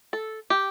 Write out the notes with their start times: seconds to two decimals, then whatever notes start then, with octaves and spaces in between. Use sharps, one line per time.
0.13 A4
0.50 G4